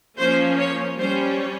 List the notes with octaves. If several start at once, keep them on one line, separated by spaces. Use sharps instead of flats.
F3 A#3 C#4 C5
C#5
G3 C#4 C5